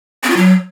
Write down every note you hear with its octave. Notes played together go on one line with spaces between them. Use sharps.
C4
F4
F#3